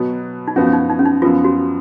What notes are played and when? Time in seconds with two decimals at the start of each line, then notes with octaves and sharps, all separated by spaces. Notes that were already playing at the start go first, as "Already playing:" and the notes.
Already playing: B2 F#3 B3
0.48 D#4
0.56 F#2 F3 B3 C#4 F#4
0.67 C#4
0.73 D#4
0.90 D#4
0.99 C#4
1.05 D#4
1.22 F#2 F3 B3 F4
1.44 F#4